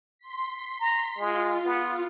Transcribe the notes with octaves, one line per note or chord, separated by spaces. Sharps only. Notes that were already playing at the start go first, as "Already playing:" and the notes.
C6 B6
A#5
G#3 F4
B3